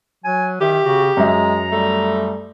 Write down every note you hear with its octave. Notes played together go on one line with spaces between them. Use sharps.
F#3 G#5
D#3 G4 E5
C#3 F#4
F#2 G#3 E5 A#5
G3 A3